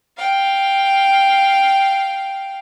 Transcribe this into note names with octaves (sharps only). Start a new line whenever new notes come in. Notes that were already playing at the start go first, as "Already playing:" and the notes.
F5 G5